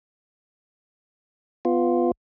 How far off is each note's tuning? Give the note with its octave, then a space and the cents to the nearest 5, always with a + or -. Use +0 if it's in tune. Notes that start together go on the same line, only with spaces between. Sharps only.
B3 +15 F4 +0